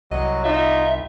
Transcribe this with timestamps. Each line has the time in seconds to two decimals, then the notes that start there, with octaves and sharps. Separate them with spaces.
0.11 C2 F#3 D#5
0.45 D#4 F4 E5